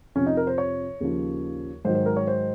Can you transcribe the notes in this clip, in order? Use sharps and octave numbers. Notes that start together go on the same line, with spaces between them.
F2 C3 F3 C#4
D#4
A#4
C5
C#5
D#2 C#3 F3
G#2 D#3 F#3 C5
C5
A#4
C#5
C5